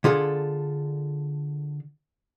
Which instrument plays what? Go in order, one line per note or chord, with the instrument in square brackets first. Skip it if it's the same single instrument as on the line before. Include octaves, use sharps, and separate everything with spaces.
[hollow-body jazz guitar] D3 F4 G#4 A4